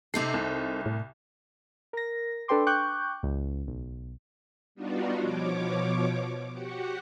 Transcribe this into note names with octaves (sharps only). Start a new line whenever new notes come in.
C3 C4 D#4 A4 C7
C2
A2
A#4 A#6
D4 A4 B4 G5 C6 D6
G5 C#6 D6 F#6 G6
C#2
B1
G3 B3 D4 D#4 F4 F#4
B2 F3 C#5 D6
F#4 G4 F#5